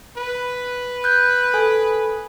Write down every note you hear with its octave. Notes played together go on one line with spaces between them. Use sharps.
B4
F#6 G6
A4 G#5